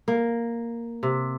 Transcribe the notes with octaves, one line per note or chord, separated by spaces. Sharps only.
A#3
C3